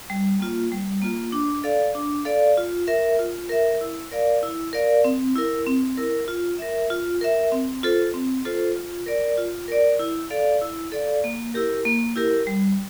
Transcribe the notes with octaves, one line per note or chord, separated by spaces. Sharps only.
G3
A#3 F4
G3
A#3 F4
D4
A4 D5 F5
D4
A4 D5 F5
F4
A#4 E5
F4
A#4 E5
E4
A#4 D5 F5
E4
A#4 D5 F5
C4
E4 A#4
C4
E4 A#4
F4
A#4 E5
F4
A#4 E5
C4
F4 A4 C5
C4
F4 A4 C5
F4
A#4 D5
F4
A#4 D5
E4
A4 D5 F5
E4
A4 D5 F5
A#3
E4 G4 A#4
A#3
E4 G4 A#4
G3